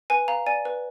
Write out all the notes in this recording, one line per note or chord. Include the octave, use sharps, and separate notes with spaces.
B4 G#5
F5 A#5
D5 G#5
B4